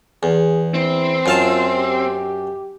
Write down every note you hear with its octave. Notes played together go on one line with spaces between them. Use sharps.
E2 G#4
C4 E4
F#2 F4 F5 A5
G4